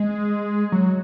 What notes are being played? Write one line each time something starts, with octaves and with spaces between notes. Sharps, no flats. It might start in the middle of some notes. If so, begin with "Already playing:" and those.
Already playing: G#3
F#3